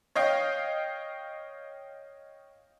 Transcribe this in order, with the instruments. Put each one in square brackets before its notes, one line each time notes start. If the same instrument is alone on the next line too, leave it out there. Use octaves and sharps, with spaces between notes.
[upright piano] C#5 D#5 F5 G5